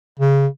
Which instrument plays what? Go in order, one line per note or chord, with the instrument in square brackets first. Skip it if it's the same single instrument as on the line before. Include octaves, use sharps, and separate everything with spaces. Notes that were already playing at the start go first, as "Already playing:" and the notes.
[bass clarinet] C#3